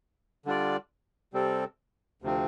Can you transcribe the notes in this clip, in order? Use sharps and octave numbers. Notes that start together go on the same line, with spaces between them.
D3 G3 D4 F4 D5
C3 G3 C4 A4
D2 C3 F3 C4